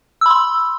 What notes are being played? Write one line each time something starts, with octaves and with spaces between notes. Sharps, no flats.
B5 C6 E6